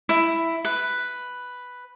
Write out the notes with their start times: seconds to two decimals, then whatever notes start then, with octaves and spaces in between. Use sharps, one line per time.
0.09 E4
0.65 B4